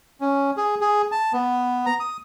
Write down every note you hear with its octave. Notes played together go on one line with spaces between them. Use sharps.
C#4
G#4
G#4
A5
B3
A#5
D#6